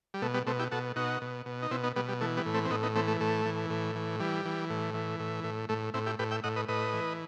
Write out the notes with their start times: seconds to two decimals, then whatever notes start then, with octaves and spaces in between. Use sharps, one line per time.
0.14 G3
0.22 B2 A3
0.34 G3 B3
0.47 B2 A3 C4
0.59 E4 G4
0.71 B2 F#4 A4
0.96 B2 D#4 F#4
1.22 B2
1.46 B2
1.62 D#4
1.71 B2 C4 E4
1.83 B3 D#4
1.96 B2 G3 B3
2.09 G3
2.21 E3 A3
2.37 G3 B3
2.46 A2
2.54 A3 C4
2.65 C4
2.70 A2 B3 D#4
2.83 B3 D#4
2.95 E3 A3 C4
3.08 A3
3.20 A2 A3
3.46 E3
3.70 A2
3.95 E3
4.20 E3 G3
4.45 E3
4.70 A2
4.94 E3
5.20 A2
5.44 A2
5.69 A2 A3
5.94 A2 C4 E4
6.06 E4 G4
6.19 A2 G4 B4
6.31 E5 G5
6.44 A2 D#5 F#5
6.56 B4 D#5
6.68 A2 B4 D#5
6.93 E3